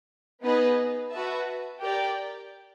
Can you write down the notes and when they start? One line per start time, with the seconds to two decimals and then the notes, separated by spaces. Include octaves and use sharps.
0.41 B3 D#4 G#4 B4 D#5
1.12 F#4 B4 E5 A5
1.81 G4 A#4 D5 G5